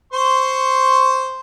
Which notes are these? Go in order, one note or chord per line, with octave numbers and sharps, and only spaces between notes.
C5 C6 C#6